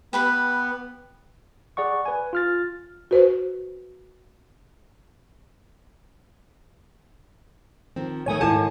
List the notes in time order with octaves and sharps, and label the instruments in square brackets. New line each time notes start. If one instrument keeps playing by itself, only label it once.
[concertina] B3 [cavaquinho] G4 B4 B5
[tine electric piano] G#4 D5 F#5 C#6
B4 G#5
F4 F6 A6
[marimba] F#4 B4 C5
[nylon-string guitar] D#3 F3 C4
[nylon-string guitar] A#2 D#3 A3 [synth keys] C#5 G#5 D#6
[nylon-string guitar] G#2 D#3 A5 [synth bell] E4 A4